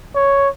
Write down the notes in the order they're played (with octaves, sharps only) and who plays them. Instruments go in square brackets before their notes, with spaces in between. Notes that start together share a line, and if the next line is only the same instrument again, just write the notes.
[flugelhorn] C#5